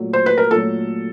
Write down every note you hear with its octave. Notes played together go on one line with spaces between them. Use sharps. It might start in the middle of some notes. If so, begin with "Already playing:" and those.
Already playing: A#2 F#3 A3
C5
B4
A#4
A#2 F#3 A3 A4